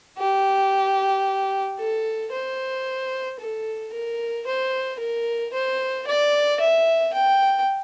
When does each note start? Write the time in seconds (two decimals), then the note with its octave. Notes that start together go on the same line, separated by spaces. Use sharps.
0.17 G4
1.78 A4
2.32 C5
3.39 A4
3.93 A#4
4.46 C5
4.99 A#4
5.53 C5
6.07 D5
6.60 E5
7.13 G5